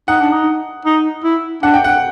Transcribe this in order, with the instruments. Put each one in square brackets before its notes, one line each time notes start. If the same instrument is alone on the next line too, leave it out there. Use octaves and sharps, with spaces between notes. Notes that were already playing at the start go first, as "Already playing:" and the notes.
[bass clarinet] D#4 [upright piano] F#5
[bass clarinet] D4
D#4
D#4
E4
[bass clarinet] D4 [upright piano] F#5
[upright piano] G5
F#5